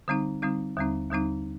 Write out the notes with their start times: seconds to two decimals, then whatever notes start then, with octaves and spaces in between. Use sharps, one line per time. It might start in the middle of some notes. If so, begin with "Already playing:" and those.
0.08 D3 G3 C4 D#4
0.42 D3 G3 C4 D#4
0.77 D#2 D3 G3 C4 D#4
1.11 D#2 D3 G3 C4 D#4